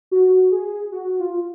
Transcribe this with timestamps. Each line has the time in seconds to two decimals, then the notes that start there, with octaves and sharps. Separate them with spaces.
0.11 F#4
0.51 G#4
0.92 F#4
1.20 F4